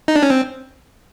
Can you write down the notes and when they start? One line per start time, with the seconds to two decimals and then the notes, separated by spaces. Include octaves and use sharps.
0.08 D#4
0.16 D4
0.23 C#4
0.30 C4